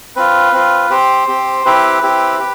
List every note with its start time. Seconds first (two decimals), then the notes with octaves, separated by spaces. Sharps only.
0.16 C4 F4 B4
0.53 C4 F4
0.90 C4 G4 C5
1.28 C4 G4
1.65 C4 E4 G4 B4
2.02 C4 E4 G4
2.39 G4